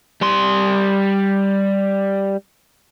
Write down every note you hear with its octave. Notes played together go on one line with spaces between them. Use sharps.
G3 C6